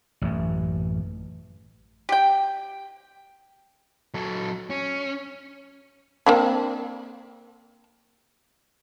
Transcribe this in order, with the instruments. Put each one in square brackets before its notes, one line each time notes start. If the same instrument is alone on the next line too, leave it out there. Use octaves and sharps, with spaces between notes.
[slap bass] A1 F#2
[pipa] G4 G5
[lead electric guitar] F#3 A4
C#4
[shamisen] A#3 C4 D4